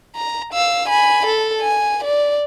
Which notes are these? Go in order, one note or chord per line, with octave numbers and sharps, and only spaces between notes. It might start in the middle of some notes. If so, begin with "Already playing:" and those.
A#5
F5 E6
G#5 B5
A4
G#5
D5